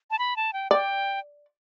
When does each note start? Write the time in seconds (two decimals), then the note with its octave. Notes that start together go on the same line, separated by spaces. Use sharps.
0.11 A5
0.19 B5
0.36 A5
0.53 G5
0.71 D5 G5